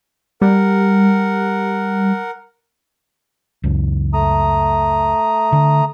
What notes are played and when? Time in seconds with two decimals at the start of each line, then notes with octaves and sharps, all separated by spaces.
0.42 G3 A#4 F#5
3.64 C#2 F#2
4.14 A3 A#5 D#6
5.52 D3